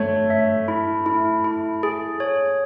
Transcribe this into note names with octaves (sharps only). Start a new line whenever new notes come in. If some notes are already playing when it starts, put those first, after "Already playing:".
Already playing: A3 C#5
E5
E4
E4
E4
G#4
C#5